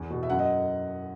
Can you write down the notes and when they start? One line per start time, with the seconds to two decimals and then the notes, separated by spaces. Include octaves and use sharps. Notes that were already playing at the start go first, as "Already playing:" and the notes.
Already playing: E2
0.10 B2
0.23 E5
0.30 F#2 F#5
0.39 D#5